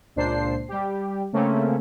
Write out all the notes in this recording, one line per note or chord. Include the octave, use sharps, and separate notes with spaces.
C#2 A#2 D4 C5 C7
G3 G4
C#3 A3 A#3 C4 C#4